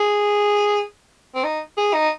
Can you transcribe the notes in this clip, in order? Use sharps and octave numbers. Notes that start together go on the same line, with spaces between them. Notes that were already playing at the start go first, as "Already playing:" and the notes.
Already playing: G#4
C4
D#4
G#4
D#4